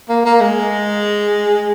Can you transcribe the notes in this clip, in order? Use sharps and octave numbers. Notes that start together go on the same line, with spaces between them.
A#3
A#3
G#3